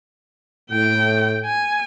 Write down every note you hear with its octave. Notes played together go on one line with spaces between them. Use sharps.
A2 G5
G#5